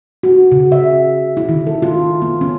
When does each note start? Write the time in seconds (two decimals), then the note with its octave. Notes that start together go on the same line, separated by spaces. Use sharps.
0.23 F#4
0.52 C#3
0.72 E5
1.37 E4
1.49 D#3
1.67 A4
1.82 F4
2.22 B3
2.41 C#4